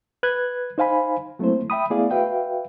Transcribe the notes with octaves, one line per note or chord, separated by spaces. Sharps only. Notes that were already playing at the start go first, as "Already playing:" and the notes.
B4 F#6 G#6
D#4 C5 F5 G#5 B5
F#3 A3 A#3 C4 E4 C5
E5 G5 B5 D#6
A3 B3 E4 G#4 D5 F5
F#4 B4 E5 F5 G5